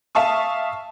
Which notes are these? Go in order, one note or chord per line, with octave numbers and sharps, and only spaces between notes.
E5 F5 A5 C#6 D#6